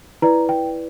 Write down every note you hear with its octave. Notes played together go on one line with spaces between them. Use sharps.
E4 B4 D5 A#5
G5